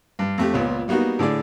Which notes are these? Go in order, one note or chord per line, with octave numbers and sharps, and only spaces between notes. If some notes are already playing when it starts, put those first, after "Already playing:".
G2
F2 A3 G4
C#2 A#2 B3 C#4
G3 A#3 B3 D#4 F#4
A2 D3 G#4 D5